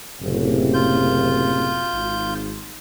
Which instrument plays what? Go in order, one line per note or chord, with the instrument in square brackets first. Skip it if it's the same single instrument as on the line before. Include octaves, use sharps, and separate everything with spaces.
[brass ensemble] F#1 A2 C3
[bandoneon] F4 G6
[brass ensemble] G#1